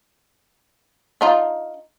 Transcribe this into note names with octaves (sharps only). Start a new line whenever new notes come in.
D4 D#4 F4